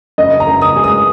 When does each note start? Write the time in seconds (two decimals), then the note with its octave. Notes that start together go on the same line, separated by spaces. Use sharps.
0.18 F#1 D#5
0.40 A#5
0.47 F#1
0.62 D#6
0.76 G#3
0.84 D#6